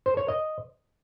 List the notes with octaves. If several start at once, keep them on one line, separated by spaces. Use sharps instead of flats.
C5
C#5
D#5